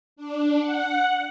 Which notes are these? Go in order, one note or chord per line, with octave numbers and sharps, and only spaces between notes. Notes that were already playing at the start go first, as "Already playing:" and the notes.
D4
F#5